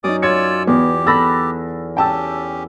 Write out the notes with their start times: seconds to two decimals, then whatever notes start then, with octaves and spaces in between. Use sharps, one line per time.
0.04 F#2 D#4 D5 D6 D#6
0.22 F4 C#5 D5 E6 G#6 C#7
0.67 E2 B3 G4
1.07 A4 B5 E6 F#6 A6 A#6
1.97 C#4 G4 G5 A5 E6